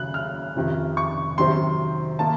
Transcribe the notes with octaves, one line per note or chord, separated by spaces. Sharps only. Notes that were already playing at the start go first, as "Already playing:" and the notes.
Already playing: D#2 C#3 F#3 F#6
F6
F1 F2 C3 D#3
C#6
C2 C3 D#3 F#3 C4 C6
D#3 A#3 D#4 A5